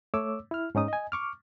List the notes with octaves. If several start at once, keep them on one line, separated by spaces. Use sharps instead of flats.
A3 C#5 D6 E6
E4 F6
G#2 C#4 D#4 D#6
D#5 G#5
C#6 D6 F6